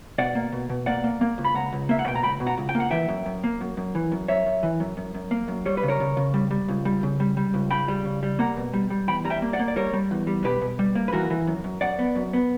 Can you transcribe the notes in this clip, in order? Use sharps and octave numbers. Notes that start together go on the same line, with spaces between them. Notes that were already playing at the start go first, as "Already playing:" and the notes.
B2 D5 F#5
A#3
B2
B2
A#3 D5 F#5
A#3
A#3
C#2
B5
C#2 F#5 A#5
C#2
A#3 E5
F#5
B2 G5
A#5
C#2 G5 B5
B2
F#5 A#5
C#2
G5
A#3
F#5
E3 E5 G5
F#2
F#2
A#3
F#2
F#2
E3
F#2
F#2 C#5 E5
F#2
E3
F#2
F#2
F#2
A#3
F#2
G3 C#5
B4
C#3
A#4 C#5
C#3
C#3
G3
G3
C#2
G3
C#3
G3
G3
C#2
C#3 G5 B5
G3
C#3
G3
A#3 F#5 A#5
B2
G3
G3
E2 G5 B5
G3 A#5
E5 G5
A#3
D5 F#5
A#3
D5
G3 A#4 C#5
G3
E2
G3
B2 G4 B4
B2
G3
A#3
B4
E3 F#4 A#4
E3
F#2
F#2
F#2 D5 F#5
B3
F#2
B3